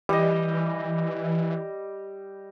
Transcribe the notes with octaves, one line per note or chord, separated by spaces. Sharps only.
E3 G3 D#5